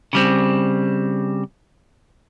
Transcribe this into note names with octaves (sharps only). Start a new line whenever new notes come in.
C#3 G3 C4